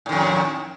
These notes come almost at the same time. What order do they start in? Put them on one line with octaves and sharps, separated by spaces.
A2 D#3 F2